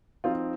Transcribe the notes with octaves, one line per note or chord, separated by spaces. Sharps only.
F3 C4 D#4 F4